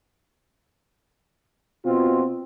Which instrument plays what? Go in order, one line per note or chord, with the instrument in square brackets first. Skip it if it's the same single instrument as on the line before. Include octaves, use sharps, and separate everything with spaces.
[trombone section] B2 C4 F4